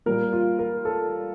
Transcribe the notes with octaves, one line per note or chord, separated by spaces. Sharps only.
A#2 G3 A#4
F4
A#4
A4